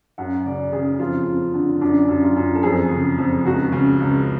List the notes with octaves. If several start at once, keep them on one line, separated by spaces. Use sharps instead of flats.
F#2 F#5
C#3 D5
C#3 G#4
F2 F4
F2
D3
F#2 D4
F#2
F4
F#2
A4
F2 G#4
C#3
F2
C#2 F#4
C#3
C#2